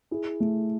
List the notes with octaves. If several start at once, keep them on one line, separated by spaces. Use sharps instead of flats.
E4 G#4
A3